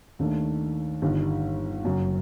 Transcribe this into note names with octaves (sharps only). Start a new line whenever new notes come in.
D#2 D#3 A3 D4
G1 G2 D#3
F#1 F#2 F#3